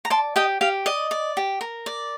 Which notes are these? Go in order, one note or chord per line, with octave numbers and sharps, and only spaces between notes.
A#5
D5 A5 C6
G4 D#5 G5
G4 F5
D5 D#5
D5
G4
A#4
D5